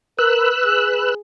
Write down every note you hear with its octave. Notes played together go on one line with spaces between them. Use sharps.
A#4 B4 E6 F#6
G#4